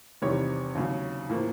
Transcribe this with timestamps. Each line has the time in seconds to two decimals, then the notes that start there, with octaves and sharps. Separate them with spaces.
0.22 E2 C3 D#3 G3 C#5
0.75 D#2 C#3 F#3
1.30 A2 F3 A#3